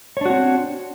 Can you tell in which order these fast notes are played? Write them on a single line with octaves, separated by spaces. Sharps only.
C#5 D4 F#4 C4